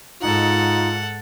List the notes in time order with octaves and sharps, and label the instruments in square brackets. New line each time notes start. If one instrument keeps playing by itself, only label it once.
[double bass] G#2 [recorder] D#4 [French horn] F4 [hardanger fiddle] A4 F#5